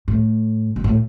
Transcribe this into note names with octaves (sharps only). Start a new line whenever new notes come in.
A2
B2
A2